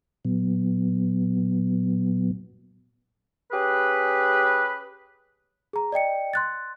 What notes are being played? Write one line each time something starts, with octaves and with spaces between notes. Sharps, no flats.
A#2 F#3 B3
C#4 G4 G#4 B4
G#4 A#5
D5 D#5 G5 C#7
C6 F#6 A6